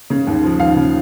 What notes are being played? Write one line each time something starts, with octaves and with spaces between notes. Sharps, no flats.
C#3
D#2
F3
D#2 F5
C#3